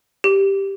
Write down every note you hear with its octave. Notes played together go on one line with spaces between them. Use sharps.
G4